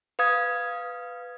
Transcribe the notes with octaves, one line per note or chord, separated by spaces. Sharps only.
B4 F5 D#6 G#6